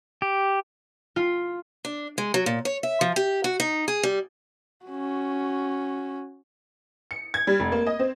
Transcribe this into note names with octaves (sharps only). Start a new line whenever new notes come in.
G4
F4
D4
G#3
F#3
A#2
C#5
E5
F3
G4
F#4
D#4
G#4
G3
C#4 F#4
C#7
G#6
G3
F1
A#3
D#5
C4